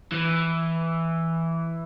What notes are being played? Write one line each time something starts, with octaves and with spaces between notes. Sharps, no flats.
E3